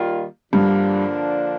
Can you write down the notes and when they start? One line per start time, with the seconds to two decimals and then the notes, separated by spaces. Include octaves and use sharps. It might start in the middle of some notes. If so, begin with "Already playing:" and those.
Already playing: D#3 G3 A#3 F4
0.53 G2 D3 F3 A#3 D4